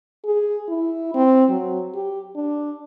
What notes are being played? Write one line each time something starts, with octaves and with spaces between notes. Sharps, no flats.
G#4
E4
C4
F#3
G4
D4